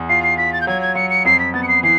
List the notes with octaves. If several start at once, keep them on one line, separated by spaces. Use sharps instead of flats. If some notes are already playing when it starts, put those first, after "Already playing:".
Already playing: E2
F4 C7
C7
F4 B6
A6
G6
F#3 G#6
G#6
F#3 C#7
C#7
F2 C7
B6
B3 A6
C#7
C7
E3 C7